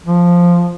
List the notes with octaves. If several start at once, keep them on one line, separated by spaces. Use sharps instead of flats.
F3